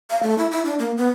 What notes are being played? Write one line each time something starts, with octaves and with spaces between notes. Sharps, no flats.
F5
A3
E4
E4
D4
A#3
B3